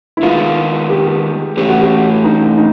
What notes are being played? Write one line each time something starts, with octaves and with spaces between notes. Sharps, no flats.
E4
D#3 G#3 B3 F4
G4
A2 E3 A3 C#4 G4
F#4
G4
D#4
D#4